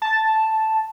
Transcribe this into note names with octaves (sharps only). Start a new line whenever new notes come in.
A5